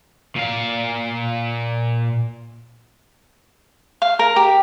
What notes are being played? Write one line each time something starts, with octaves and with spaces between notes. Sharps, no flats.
A#2 F5
F5
A#4
G4